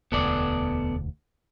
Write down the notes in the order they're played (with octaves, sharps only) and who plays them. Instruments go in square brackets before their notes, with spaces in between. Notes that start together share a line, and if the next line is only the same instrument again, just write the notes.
[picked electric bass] E1 D2 [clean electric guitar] B3 A4 D5